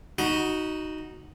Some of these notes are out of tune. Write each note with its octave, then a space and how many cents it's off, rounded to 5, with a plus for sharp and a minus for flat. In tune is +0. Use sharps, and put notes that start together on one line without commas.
D#4 +0 F#4 +0 B5 -45